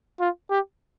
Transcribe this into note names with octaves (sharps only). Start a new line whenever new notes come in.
F4
G4